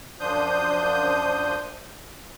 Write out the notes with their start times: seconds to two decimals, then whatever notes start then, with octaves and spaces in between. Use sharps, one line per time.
0.20 F#2 F3 D4 C5 D#6 G6